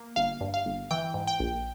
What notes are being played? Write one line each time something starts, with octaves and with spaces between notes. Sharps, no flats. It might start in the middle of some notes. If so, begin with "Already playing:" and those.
Already playing: A#3
G1 F5
G2
F5
G1
E3 G5
G#2
G5
A#1